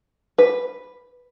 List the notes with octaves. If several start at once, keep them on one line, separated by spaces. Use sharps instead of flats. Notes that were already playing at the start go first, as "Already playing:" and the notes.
B4